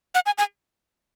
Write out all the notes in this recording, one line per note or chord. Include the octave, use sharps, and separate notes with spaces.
F#5
G#5
G#5